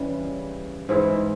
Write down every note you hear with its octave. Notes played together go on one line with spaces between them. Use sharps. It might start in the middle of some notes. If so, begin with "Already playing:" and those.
Already playing: C#3 E3 G3
G#2 E3 G#3 E4